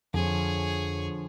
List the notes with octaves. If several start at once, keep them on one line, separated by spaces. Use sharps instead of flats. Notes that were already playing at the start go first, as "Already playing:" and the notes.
F2 D3 F3 G#4 C#5